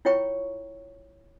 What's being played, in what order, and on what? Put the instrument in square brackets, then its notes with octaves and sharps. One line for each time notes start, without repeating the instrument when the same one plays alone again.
[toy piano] E4 F4 C#5 G5 A#5 C#6